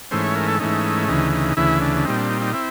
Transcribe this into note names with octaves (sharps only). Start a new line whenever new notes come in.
G#2 E3 A3 C#4 C5
C#5
A#4
A4
G#2 E3 A3 C#4 D#4
D2 C#3 E3 D#4
D#4
D2 C#3 E3 E4
D4
D4
A#2 G3 C4 D#4
D4
D#4
D#4
C4 E4